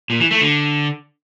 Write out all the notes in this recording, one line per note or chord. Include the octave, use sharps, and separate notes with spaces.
A#2
E3
A3
D3